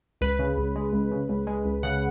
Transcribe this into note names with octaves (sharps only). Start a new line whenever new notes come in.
C#2 B4
C#3
C#2
G#3
C#2
C#3
C#2
G#3
C#2
C#3 F#5